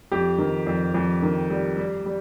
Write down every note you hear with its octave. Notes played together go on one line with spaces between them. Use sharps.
F2 G4
D#3
F2
F2
D#3
G3
G3
G3